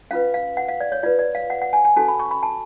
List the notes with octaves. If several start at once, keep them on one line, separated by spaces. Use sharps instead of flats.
C#4 F4 B4 F5
F5
F#5
F5
D5
C#5
F4 B4 D5
D5
F5
F#5
F#5
G#5
G#5
C#4 F#4 A4 A5
B5
C#6
B5
A5